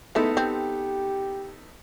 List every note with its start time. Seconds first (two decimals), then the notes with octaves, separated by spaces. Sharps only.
0.15 G#3 A3 B3 D#4 E4 A4
0.37 C4 G4